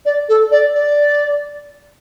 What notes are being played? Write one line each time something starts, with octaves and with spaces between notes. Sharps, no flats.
D5
A4
D5
D5